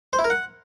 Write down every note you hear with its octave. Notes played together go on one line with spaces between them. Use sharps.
C5
E4
A#4
F#5